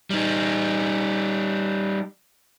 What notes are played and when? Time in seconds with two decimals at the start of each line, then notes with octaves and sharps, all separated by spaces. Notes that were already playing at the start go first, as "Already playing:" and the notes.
0.10 G3 D#4